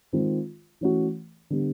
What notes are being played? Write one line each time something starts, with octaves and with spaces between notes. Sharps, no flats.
D#3 G#3 C4 F4
E3 A3 C#4 F#4
D3 G3 B3